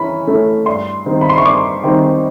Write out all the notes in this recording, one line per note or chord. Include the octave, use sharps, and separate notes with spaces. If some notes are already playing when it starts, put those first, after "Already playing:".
Already playing: E3 C#4 B5
A3 C#4 E4
G2 C6
D#3 G3 C4 D#4
B5
C6
C#6
G2 D6
D#3 G3 C4 D#4